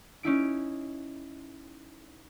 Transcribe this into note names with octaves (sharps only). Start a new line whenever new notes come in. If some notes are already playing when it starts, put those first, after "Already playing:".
C#4 D#4 E4 D7